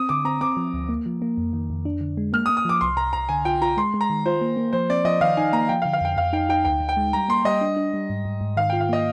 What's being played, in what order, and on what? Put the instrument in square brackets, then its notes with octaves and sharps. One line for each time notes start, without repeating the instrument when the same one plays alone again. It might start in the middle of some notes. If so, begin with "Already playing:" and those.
Already playing: [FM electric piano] C4 [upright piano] D#6
[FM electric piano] D3 [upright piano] D6
[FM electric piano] C4 [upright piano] A#5
[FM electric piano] C4 [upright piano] D6
[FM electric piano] F3
D2
A#3
F3
A#3
F2
D#3
F2
D4
D3
G#3
[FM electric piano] A#3 [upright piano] F6
[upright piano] D#6
[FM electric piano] A#3
[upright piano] D#6
[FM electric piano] F3 [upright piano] D6
[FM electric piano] C2 [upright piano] C6
[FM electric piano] C2 [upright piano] A#5
[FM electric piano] C2 [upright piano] A#5
[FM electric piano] D3 [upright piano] G#5
[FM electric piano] F4 [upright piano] G5
[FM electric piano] F4 [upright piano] A#5
[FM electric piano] G#3 [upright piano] C6
[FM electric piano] G#3
[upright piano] A#5
[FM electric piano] D#3
[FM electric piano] F4 [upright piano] C5
[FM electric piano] A#3
A#3
[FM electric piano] F3 [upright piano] C5
[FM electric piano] C4 [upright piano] D5
[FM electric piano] F3 [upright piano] D#5
[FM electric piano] D#3 [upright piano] F5
[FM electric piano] D#4 [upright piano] G#5
[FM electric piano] A#3 [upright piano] A#5
[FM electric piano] F3 [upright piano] G5
[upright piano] F5
[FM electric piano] D3
[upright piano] F5
[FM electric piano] F2 [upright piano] G5
[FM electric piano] F2 [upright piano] F5
[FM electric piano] D#4 [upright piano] G5
[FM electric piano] D#4 [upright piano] G5
[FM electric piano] D2 [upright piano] G5
[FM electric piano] D2
[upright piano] G5
[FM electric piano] G#3
[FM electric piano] G3 [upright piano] A#5
[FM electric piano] A#3 [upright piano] C6
[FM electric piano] G3 [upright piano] D#5
[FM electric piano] D4
D4
G3
G#2
G#2
G#2
[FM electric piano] D#3 [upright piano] F5
[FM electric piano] F4 [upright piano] G5
[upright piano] F5
[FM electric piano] A#3 [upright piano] D#5